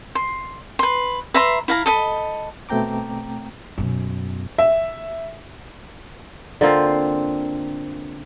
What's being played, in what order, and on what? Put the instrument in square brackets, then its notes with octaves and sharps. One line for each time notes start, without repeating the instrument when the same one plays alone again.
[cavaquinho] C6
B4 C6
B4 E5 A#5 C6
E4 F5 A#5
A4 D#5 B5
[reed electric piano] B2 A3 C4 G5 A#5 D6
[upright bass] F#2 B2
[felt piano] E5
[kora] D3 A#3 C4 F4